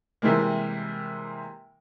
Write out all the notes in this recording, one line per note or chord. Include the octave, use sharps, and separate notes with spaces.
C3 E3 G3 G#3 A#3